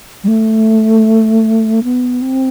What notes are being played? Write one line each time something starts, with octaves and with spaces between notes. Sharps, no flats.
G3
A3
B3
C4